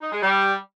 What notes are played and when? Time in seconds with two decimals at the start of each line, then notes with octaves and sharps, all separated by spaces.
0.01 D#4
0.12 G#3
0.23 G3